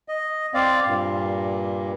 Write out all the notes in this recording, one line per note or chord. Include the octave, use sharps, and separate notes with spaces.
D#5
C4 D5 F5
G2 A#2